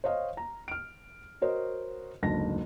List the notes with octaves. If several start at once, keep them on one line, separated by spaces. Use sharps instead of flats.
C5 C#5 D#5 F5
A#5
F6 D7
F#4 A#4 C5 C#5 D#5
F#1 D2 G#2 A5 A#6